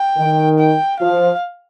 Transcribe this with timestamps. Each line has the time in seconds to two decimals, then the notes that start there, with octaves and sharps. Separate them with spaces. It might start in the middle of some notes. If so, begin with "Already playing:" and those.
Already playing: G5
0.16 D#3
0.58 G5
0.99 F3 F5